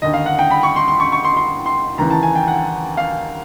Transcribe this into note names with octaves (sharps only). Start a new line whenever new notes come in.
D#2 D3 D#5
F5
F#5
G5
B5
C#6
C6
C6
C#6
C#6
C6
C6
C6
D#2 C#3 E3 A#5
A5
G#5
G5
F#5
F5